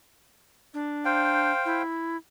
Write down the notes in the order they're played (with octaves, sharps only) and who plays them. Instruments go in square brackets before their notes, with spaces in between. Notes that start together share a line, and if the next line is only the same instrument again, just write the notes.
[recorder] D4
[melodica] C5 F5 G5
[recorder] E4